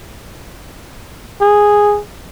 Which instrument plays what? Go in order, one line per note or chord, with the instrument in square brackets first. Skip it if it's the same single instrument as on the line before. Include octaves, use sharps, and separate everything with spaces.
[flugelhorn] G#4